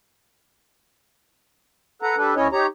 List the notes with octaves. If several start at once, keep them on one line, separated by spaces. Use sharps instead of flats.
A4 B4 F#5 A#5
G3 D4 A4 B4
D2 C#4 E4 C#5 D#5
D#4 G4 C#5 A#5